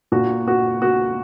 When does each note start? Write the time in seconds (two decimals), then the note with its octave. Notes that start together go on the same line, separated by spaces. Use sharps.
0.12 A#2 F#4
0.48 F#4
0.82 F#4